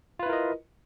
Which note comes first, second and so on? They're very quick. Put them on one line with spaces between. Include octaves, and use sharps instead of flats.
F4 B4 E4 A#4 D#5